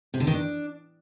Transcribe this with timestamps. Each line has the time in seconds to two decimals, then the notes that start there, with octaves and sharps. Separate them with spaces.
0.14 C3
0.20 D3
0.27 D#3
0.34 D4